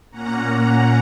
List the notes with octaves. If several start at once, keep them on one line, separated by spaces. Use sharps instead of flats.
A#2 A#3 C#4 F#5 A#5